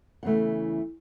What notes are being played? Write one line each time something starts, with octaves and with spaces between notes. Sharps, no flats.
E2 C#3 E3 A3 F#5